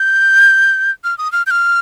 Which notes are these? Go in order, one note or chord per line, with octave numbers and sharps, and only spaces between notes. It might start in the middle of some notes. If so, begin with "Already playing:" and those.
Already playing: G6
F6
D#6
F6
G6
F6